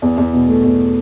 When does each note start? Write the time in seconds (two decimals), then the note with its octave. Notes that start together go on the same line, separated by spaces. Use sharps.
0.02 E2
0.18 E2
0.33 B2
0.48 A3
0.64 E2